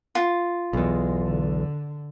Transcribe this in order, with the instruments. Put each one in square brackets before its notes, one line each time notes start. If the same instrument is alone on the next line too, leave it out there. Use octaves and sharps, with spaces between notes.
[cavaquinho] F4
[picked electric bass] B1 E2 [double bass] G#3
[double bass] D3